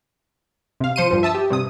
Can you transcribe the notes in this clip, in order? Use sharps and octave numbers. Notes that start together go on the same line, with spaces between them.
C3 F5
F3 C5 C6 C#7 D#7
G2 F3
E5 A5 D#6 E6
G4
G2 C3 D#6